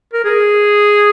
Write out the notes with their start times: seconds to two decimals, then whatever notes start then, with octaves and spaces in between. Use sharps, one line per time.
0.13 A#4
0.24 G#4